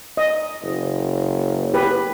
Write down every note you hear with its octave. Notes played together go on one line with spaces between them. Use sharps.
D#5
F#1
G4 B4